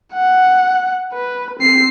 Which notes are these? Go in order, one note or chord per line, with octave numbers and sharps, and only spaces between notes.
F#5
B4
C4 C7